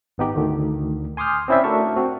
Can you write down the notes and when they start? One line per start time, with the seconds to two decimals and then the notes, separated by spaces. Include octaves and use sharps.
0.18 G#1 B3 D#4 G4
0.35 D2 D3 D#3
1.17 G#5 C6 D6 D#6 F6 G6
1.48 C4 C#4 E4 C5 D5 E5
1.64 A3 D4 F#4 A#4 A5 C#6
1.96 C4 F#4